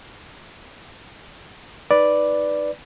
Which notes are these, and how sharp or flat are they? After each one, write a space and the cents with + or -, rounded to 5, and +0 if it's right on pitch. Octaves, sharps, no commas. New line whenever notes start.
D#4 +0 B4 +0 D5 +0